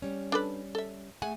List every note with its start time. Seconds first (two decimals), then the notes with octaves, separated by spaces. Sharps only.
0.02 G3 C#4
0.32 D4 A4 B4
0.75 A4 E5
1.22 A3 G#4 F#5 G#5